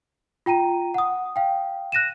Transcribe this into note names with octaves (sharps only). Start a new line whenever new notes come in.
F4 G5 A#5 D#7
F#5 D#6
F5 G5
F#6 A#6 D#7 E7